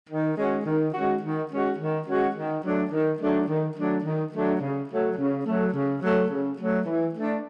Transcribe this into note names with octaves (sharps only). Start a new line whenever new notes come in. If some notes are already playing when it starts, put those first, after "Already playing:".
D#3
G#3 C#4 F#4
D#3
G#3 C#4 F#4
D#3
G#3 C#4 F#4
D#3
G#3 C#4 F#4
D#3
F#3 A3 D4
D#3
F#3 A3 D4
D#3
F#3 A3 D4
D#3
F#3 A3 D4
C#3
F#3 A3
C#3
F#3 A3
C#3
F#3 A3
C#3
F#3 A3
E3
A3 D4